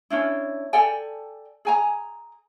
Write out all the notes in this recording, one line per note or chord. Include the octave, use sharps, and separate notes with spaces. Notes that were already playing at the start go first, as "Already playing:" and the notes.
C#4 D4 E4
A4 D5 G5 G#5
G#4 G#5 A#5